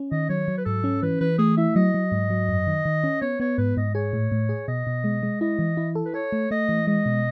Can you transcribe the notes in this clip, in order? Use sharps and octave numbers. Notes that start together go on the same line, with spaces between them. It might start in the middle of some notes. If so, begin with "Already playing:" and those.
Already playing: C#4
D#3 D#5
F#3 C#5
F#3
B4
G#2 A4
C#4
E3 B4
E3 B4
A3 G#4
E4 E5
F#3 D#5
F#3
G#2
F#3
F#2
D#3
D#3
C#4
B3 C#5
B3 C#5
G#2 B4
G#2 D#5
G#4 C#5
A2
A2
G#4
B2 D#5
B2
G#3
G#3
E4 D#5
E3
E4
A4
B4
A4 C#5
A3
A3 D#5
E3
G#3 D#5
B2